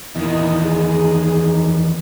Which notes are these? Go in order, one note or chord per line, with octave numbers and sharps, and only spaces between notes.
E2 A#2 D#3 E4 D#5
D#4 G#4